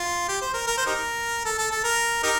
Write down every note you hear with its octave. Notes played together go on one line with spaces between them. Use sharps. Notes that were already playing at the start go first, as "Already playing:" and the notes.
Already playing: F4
G4
C5
A#4
A#4
C5
D#4 G4 A#4
A4
A4
A4
A#4
D#4 G4 A#4